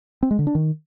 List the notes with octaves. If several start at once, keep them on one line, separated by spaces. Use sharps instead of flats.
C4
G#3
D3
D4
D#3